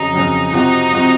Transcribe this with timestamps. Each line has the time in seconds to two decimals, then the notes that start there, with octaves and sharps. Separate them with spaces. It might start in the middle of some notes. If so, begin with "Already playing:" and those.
Already playing: F2 C#3 F#3 D#4
0.13 F2 C#3 F#3
0.52 C3 F3 C4 D#4 F#4
0.91 C3 F3 C4 F#4